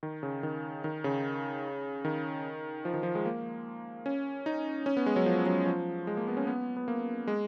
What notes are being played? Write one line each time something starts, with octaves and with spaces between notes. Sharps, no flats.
D#3
C#3
D#3
D#3
C#3
D#3
F3
D#3
F3
G#3
A#3
C#4
D#4
C#4
B3
G#3
F#3
F3
F#3
F3
G#3
A#3
B3
C#4
B3
B3
A#3
G#3